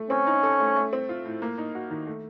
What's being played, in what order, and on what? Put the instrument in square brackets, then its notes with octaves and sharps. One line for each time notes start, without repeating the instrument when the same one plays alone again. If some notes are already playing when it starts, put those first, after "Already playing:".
Already playing: [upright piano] A3
[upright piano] C4 [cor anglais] C#4
[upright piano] D#4
A4
A3
A3
C4
F4
A2
A#3
D#4
F#4
D#3
A3